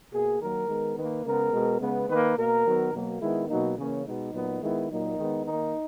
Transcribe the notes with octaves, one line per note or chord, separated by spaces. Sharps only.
B2 A#3 G#4
D#3 F#3 A#3 A#4
D#3 G#3 B3
D#3 A#3 B4
C#3 G#3 B3 A#4
B2 G#3 B3
C#3 G#3 B3
D#3 A#3 B4
B2 A#3 A#4
D#3 F#3 B3
B2 F#3 A#3
D#3 G#3 B3 E4
B2 F#3 A#3 D#4
C#3 E3 A#3 C#4
B2 G#3 B3 D#4
A#2 F#3 B3
D#3 G#3 B3 E4
A#2 F#3 A#3 D#4
D#3 G#3 B3
D#3 A#3 D#4